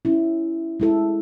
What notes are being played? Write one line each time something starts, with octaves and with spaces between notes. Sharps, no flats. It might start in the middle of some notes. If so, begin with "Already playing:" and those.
C#4 E4
G#3 E4 A4